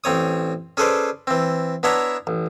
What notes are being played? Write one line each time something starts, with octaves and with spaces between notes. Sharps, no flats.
A1 C4 C#5 D#6
C#4 G#4 A4 B4 C5 D5
E3 C4
B3 D4 E4 C#5 E5 A#5
A1